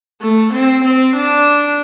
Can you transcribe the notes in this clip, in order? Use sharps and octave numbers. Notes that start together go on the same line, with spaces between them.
A3
C4
C4
D4